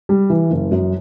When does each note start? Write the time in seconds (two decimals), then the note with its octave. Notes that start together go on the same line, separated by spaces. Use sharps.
0.09 G3
0.30 E3
0.51 F#1
0.71 F#2